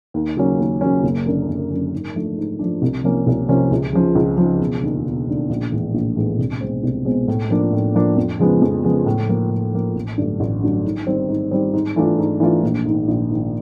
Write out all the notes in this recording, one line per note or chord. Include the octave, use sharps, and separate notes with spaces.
D#2
C#3 F#3 A#3 C#4
D#2
C#3 F#3 A#3 C#4
F#1
F#2 D3
F#1
F#2 D3
G#2
F3 A3 D4
G#2
F3 A3 D4
C2
C3 F3 A#3 C#4
C2
C3 F3 A#3 C#4
C#2
C#3 F3
C#2
C#3 F3
E1
D#2 D3
E1
D#2 D3
A#1
A2 E3 G#3 B3
A#1
A2 E3 G#3 B3
C2
B2 G#3 C4
C2
B2 G#3 C4
A2
F3 A#3 D4
A2
F3 A#3 D4
F2
C#3 F3 G#3 B3
F2
C#3 F3 G#3 B3
A2
F3 A#3
A2
F3 A#3
A1
G2 D3 F#3 A3
A1
G2 D3 F#3 A3
G#2
D#3 G3 C4
G#2
D#3 G3 C4
G#2
E3 A3 D4 F4
G#2
E3 A3 D4 F4
A#1
G#2 D#3
A#1
G#2 D#3